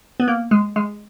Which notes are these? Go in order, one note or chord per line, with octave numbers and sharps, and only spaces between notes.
B3
A#3
G#3
G#3